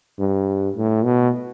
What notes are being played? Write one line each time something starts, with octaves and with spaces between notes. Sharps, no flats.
G2
A2
B2